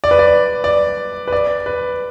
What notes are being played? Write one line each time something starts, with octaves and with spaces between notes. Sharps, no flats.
D5
B4
D5
D5
B4
D5
B4